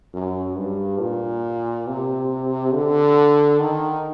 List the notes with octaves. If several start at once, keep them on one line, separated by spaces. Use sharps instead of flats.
F#2
G2
A#2
C3
D3
D#3